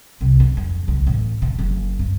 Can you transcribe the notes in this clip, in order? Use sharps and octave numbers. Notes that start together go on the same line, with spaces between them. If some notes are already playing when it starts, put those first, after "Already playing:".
C2
D3
F2
C#2
A1
D3
F#1
G2